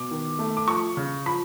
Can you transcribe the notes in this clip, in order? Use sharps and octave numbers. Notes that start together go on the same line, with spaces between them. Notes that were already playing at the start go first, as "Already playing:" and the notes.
Already playing: B2 D6
D#3
A3
D6
F3 C#6
C#3
F3 B5